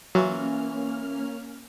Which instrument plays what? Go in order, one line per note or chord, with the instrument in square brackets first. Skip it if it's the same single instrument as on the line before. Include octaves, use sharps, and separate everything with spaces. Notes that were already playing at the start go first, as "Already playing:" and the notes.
[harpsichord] E3 F4 F#4 [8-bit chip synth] F#3 [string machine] A#3 C#4 F6